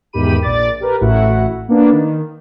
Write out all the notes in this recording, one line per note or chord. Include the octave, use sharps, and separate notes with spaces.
E2 G#2 D#3 G4 B5 D#7
A#1 D5 D6 A6
G4 A#4 B4
A1 A2 E4 F#4 F#5
A#3 B3 D4
D#3